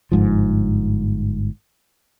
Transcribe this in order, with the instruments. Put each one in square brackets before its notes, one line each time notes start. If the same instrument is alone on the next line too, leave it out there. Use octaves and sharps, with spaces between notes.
[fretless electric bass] G1 G#2 F3